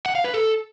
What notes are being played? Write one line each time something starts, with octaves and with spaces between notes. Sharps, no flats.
F#5
F5
B4
A4